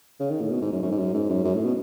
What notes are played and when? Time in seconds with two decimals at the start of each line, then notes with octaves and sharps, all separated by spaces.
0.20 C#3
0.30 D#3
0.41 A2
0.51 B2
0.62 G#2
0.72 F#2
0.82 F#2
0.91 G#2
0.98 F#2
1.14 G#2
1.29 F#2
1.45 F#2
1.54 A2
1.65 B2